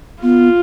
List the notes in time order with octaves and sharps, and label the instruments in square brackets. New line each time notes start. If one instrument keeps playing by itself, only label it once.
[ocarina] B3 [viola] F4